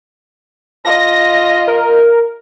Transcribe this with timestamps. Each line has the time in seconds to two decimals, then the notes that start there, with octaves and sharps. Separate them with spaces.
0.85 F4 D#5 A#6
1.67 A#4